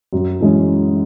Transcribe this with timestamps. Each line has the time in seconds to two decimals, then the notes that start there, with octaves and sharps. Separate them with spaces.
0.13 F#2
0.41 E3 G#3 C#4